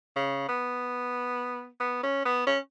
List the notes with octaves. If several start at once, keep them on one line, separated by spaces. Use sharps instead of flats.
C#3
B3
B3
C#4
B3
C#4